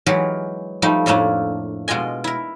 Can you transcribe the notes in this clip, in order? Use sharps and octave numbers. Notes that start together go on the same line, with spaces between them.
E3 F#3 G#3 G4 G#4 A#4
F3 G3 A3 D#4 G4
F2 A2 A3 A#3 D4
B2 G#3 F4 D#5 G#5
E4 A#4